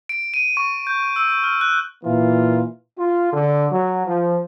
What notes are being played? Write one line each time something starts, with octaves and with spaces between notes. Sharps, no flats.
D7
D#7
C#6
G6
E6
F6
F#6
A#2 E3 A#3 F4
F4
D3
F#3
F3